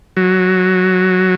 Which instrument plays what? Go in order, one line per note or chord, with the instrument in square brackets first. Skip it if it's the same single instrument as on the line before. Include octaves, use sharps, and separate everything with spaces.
[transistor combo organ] F#3